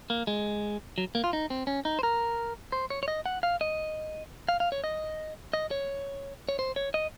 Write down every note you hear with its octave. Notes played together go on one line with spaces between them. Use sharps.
A#3
G#3
F#3
A#3
F4
D#4
C4
C#4
D#4
C5
A#4
C5
C#5
C#5
D#5
F#5
F5
D#5
F5
F5
C#5
D#5
D#5
C#5
C#5
C5
C#5
D#5